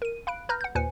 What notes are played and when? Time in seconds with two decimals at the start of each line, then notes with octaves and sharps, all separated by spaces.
0.02 A#4 D#7
0.27 F5 B5 F#6 D7
0.49 B4 A#5 B5 F6 G6 A#6
0.61 F#5 G6
0.75 D#2 A#2 B4 C5 G#5 C#7